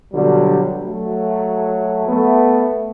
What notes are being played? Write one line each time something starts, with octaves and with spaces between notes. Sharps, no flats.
B2 D3 F#3 G3
F#3 A3
A3 B3